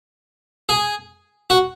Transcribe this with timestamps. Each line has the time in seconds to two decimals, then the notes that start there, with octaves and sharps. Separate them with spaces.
0.69 G#4
1.50 F#4